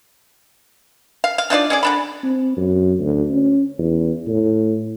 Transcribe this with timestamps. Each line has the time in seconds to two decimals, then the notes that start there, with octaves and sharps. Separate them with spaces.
1.24 F5
1.38 F5
1.50 D4 D#4 F4 D5
1.70 C#4 G#4 D5
1.83 D3 D4 B5
2.23 C4
2.57 F#2
2.99 D2
3.31 C#4
3.78 E2
4.27 A2